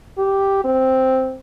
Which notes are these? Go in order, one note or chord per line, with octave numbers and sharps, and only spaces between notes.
G4
C4